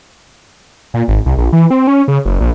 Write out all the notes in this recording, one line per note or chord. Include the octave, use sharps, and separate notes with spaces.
A#2
G#1
C2
A#1
E3
C4
C#4
C#3
F#1
A#1